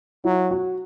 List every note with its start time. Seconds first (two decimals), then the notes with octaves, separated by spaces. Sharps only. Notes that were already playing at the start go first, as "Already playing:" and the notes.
0.24 F#3 E4
0.51 F#4